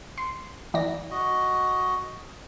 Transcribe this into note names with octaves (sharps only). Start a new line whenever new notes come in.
C6
E3 D5 A#6
F#4 D#5